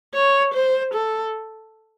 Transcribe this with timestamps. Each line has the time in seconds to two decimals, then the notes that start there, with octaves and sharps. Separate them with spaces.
0.14 C#5
0.54 C5
0.94 A4